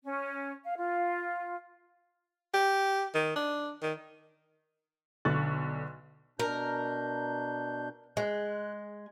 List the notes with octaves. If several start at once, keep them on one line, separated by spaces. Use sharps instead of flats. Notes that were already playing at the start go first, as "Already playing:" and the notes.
C#4
F5
F4
G4
D#3
D4
D#3
B1 D3 C#6 F#6 A6
B2 D4 A#4 G6
G#3 F#6